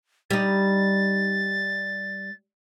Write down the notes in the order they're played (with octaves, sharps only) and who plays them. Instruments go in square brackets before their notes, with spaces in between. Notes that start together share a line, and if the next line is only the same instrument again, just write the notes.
[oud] G3 D#4 [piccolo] A6